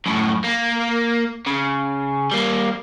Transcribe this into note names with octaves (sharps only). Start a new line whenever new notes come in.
F#2 A2
A#3
C#3
G3 A#3